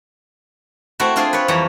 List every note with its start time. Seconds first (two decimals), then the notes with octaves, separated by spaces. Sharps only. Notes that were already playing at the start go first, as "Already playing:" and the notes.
1.00 A3 C4 E4 F#4
1.16 C4 D4 F4 G#4
1.33 B4 C#5
1.48 F2 E3 G3 C#5 A#5